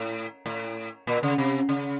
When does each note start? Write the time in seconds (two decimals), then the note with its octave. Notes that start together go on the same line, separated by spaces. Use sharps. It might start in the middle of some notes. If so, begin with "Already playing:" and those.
Already playing: A2
0.46 A2
1.07 A#2
1.23 C#3
1.38 C3
1.69 C#3